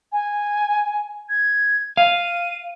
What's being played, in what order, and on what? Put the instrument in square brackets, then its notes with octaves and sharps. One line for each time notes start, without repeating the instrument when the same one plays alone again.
[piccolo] G#5
G#6
[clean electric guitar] F5 [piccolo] D#7